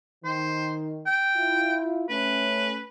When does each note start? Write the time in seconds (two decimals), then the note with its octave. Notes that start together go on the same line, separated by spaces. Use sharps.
0.25 D#3 C5
1.06 G5
1.36 E4 F4
2.09 A3 C#4 B4